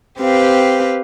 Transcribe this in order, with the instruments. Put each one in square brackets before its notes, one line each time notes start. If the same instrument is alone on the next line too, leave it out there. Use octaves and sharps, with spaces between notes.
[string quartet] C4 G4 B4 F5